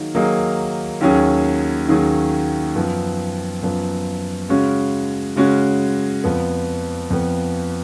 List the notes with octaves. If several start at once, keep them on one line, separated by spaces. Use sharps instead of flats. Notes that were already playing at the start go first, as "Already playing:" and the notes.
Already playing: D#3 F#3 A#3 D#4 G#4
D#3 F#3 A#3 D#4 G#4
D#2 D#3 F#3 C#4 G#4
D#2 D#3 F#3 C#4 G#4
F#2 F3 B3
F#2 F3 B3
C#3 G#3 C#4 F#4
C#3 G#3 C#4 F#4
F2 F3 B3
F2 F3 B3